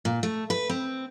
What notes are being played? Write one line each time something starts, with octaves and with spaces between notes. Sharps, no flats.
A#2
A3
B4
C4